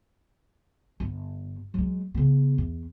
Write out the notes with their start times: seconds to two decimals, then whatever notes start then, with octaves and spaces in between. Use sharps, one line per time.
1.00 G1
1.74 F#3 G#3
2.14 C#3 B3
2.58 E2